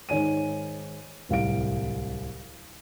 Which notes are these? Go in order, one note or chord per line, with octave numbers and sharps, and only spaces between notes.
G#2 D#3 C#5 G#5 D#7
D1 C2 F5 D7